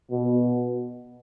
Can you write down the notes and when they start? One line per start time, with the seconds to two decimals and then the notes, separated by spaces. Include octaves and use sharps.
0.11 B2